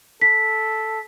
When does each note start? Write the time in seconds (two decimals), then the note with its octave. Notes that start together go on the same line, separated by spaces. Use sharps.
0.21 A4 B6